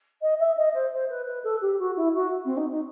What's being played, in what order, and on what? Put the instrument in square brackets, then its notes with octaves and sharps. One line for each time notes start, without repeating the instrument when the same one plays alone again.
[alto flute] D#5
E5
D#5
C5
C5
B4
B4
A4
G4
F#4
E4
F#4
C4
D#4
D#4